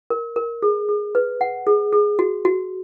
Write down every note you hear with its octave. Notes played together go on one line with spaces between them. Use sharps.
A#4
A#4
G#4
G#4
B4
F#5
G#4
G#4
F#4
F#4